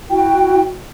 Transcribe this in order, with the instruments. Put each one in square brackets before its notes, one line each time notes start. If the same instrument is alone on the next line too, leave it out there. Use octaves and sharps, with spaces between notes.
[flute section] E4 F#4 G5